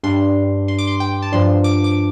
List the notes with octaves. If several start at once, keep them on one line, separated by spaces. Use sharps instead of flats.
G2 G3 D4 C6
C6
D6
C6
G5
A5
G2 F3 D4 C6
D6
D6